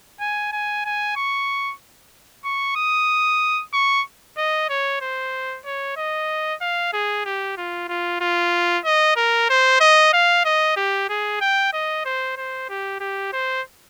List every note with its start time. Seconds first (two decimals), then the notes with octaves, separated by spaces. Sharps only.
0.20 G#5
0.52 G#5
0.85 G#5
1.16 C#6
2.45 C#6
2.76 D#6
3.73 C#6
4.37 D#5
4.69 C#5
5.01 C5
5.65 C#5
5.97 D#5
6.61 F5
6.93 G#4
7.26 G4
7.58 F4
7.89 F4
8.21 F4
8.85 D#5
9.16 A#4
9.50 C5
9.80 D#5
10.13 F5
10.45 D#5
10.76 G4
11.10 G#4
11.41 G5
11.73 D#5
12.05 C5
12.37 C5
12.69 G4
13.00 G4
13.33 C5